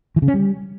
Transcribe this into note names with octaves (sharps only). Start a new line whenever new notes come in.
E3
C#3
C#4
G3